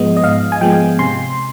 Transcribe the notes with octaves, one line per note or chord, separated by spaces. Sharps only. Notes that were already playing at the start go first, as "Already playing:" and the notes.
Already playing: G#2 F3 G#3 B3 D#5
D#5
G#2 F5
G#5
F3 G#3 B3 G5
C3 C6